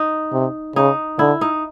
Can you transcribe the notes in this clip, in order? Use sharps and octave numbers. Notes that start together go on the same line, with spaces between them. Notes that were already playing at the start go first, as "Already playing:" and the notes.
Already playing: D#4
C3
C#3 D#4
D3 E4
D#4